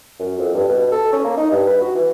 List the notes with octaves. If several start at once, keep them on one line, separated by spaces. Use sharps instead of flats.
F#2
F2
G2
B2
A4
C#4
A#3
D#4
G2
B4
F#4
E3